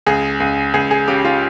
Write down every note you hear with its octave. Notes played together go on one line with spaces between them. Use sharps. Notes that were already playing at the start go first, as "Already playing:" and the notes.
C#2 G#4
C#2
C#2 G#4
G#4
C#3 G4
F4